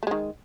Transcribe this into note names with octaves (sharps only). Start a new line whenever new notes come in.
D#3 G#3 A3